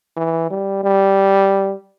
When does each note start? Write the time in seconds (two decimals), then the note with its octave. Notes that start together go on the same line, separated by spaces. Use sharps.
0.17 E3
0.51 G3
0.83 G3